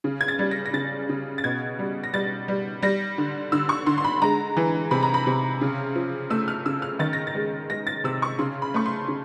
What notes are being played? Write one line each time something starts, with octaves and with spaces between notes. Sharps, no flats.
C#3
G#6
A6
G3
A#6
A#6
C#3 A6
C#3
A6
B2 G#6
G3
A#6
G3 A6
G3
G3 A#6
D3
D3 E6
C#6
D3 C6
C6
B5
G#3 A#5
E3
C3 B5
A#5
B5
C3
C#3
F3
A3 E6
F6
C#3 E6
F6
D#3 A6
A#6
A6
G#3
G#3 A#6
A6
C3 E6
C#6
C#3 C6
B5
A3 C#6
C6
C#3